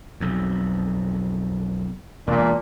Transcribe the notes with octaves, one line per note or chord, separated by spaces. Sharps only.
B1 F2
E1 A#2 D4